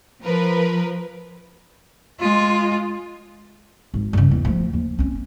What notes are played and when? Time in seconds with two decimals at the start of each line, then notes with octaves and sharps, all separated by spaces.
0.24 F3 A#4 B4
2.20 G#3 F4
3.94 G#1
4.13 G2 C#3
4.31 E2
4.45 F3 A3
4.73 D#2
4.99 C4 C#4